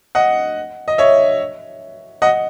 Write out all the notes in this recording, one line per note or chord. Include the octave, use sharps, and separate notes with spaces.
D#5 F#5
D#5
C#5 E5
D#5 F#5